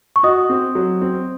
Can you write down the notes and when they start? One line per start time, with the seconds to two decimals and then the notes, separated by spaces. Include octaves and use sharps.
0.16 C#6
0.23 F#4 D#5 D#6
0.50 C4
0.75 F#3
1.01 C4